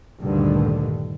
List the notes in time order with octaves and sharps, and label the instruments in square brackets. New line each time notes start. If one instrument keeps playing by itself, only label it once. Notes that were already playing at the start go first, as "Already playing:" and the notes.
[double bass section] D2 G2 A#2 D3 D#3